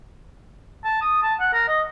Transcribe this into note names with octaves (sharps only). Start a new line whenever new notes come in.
A5
D#6
A5
F#5
A#4
D#5